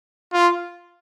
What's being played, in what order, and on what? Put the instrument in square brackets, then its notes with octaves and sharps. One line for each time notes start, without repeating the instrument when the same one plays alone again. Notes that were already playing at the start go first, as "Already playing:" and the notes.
[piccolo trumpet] F4